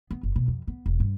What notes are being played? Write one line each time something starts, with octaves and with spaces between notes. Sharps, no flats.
B3
F#1
B2
F2
B3
E1
G2